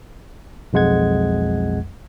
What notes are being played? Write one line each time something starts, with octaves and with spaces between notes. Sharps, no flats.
B1 F2 G#3 F#5 G#6